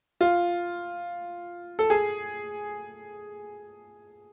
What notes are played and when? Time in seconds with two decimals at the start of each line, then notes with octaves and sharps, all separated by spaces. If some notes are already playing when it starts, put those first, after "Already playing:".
0.21 F4
1.79 A4
1.90 G#4